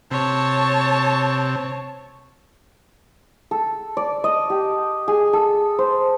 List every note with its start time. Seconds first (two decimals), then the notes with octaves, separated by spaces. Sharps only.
0.11 C3 C#5 A5
3.51 A4
3.97 D5
4.24 D#5
4.50 G4
5.08 G#4
5.33 A4
5.79 C5